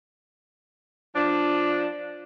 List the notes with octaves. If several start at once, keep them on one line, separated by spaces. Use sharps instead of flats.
F3 D4